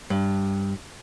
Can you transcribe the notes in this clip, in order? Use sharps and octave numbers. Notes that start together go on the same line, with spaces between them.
G2